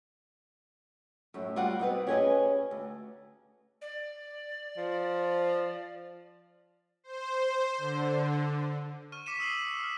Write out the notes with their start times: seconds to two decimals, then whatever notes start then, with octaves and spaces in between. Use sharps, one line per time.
1.34 F#2 A2
1.56 G3 F4 F#4 F#5
1.79 B2 C4 B4
2.07 C#4 G4 G#4 A#4 B4 D#5
2.71 D2
3.82 D5
4.77 F3
7.04 C5
7.78 D3
9.12 C#6 F6 D#7
9.26 D6 B6 C#7 D#7 E7
9.40 D#6 E6 C7 F#7
9.60 C7
9.81 F6 C7